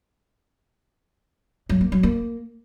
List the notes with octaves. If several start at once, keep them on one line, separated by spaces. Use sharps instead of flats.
F#3
A#3
F#3
A#3